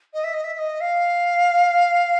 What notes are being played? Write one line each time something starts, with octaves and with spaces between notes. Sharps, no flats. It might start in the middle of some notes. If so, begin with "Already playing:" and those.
D#5
E5
D#5
E5
E5
D#5
F5